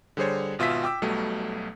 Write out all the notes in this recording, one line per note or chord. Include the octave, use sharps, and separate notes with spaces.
D3 G3 G#4 C5 C#5
G#1 B2 F4 E5 E6 B6
G5 D6 E6
B1 B2 F#3 G3 A3